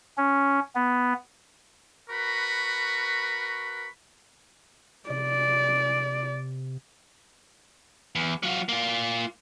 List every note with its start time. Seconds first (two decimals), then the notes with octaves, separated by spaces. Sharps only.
0.17 C#4
0.75 B3
2.10 F#4 A#4 B4 B5 C#6
5.10 C3 D5
8.15 E2
8.43 F#3 F4
8.69 A#3 F4